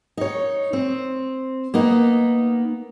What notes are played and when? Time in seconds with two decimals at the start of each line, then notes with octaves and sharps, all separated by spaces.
0.17 D#4 C#5
0.73 C4
1.74 A#3 B3 D#4